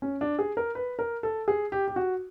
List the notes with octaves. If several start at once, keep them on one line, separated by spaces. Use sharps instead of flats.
C#4
D4
G#4
A#4
B4
A#4
A4
G#4
G4
G4
F#4